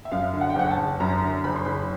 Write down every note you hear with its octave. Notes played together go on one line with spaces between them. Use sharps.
E5
F#2 F5
D3
F#5
G5
F#1 F#5
A5
F#1
F#2 A#5
D3
F#1 B5
C6
F#1 B5